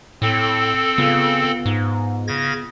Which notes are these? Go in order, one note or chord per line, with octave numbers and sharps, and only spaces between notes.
A2 C4 A4
C#3 B3 F4
G#2
C#3 G#6 A#6